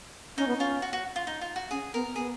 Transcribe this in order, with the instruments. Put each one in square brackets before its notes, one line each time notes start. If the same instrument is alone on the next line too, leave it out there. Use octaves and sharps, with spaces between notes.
[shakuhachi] C#4 [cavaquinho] D#4
[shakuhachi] B3
[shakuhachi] C#4 [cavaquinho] F4
[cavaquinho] F#4
F#4
F4
D#4
F4
F#4
[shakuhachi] C#4 [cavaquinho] G#4
[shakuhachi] B3 [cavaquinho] A#4
[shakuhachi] B3 [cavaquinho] G#4